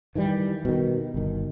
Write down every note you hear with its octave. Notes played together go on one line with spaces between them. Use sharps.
D#3 E3 F#3 G3
B2 D#3
G1 D#3